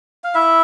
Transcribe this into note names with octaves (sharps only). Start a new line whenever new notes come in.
F5
E4 E5